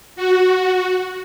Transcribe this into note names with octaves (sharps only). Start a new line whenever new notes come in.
F#4